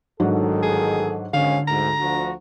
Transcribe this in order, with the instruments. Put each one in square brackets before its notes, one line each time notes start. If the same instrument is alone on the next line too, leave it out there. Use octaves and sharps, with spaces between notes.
[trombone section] A1 D#3 A4 [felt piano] G#2 F#3 D4
[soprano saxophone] G#4
[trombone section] G#1 G#3 C#4 [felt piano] D3 [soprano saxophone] F5
[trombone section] D2 G#2 [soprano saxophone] A#5
[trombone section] D2 F3 F#4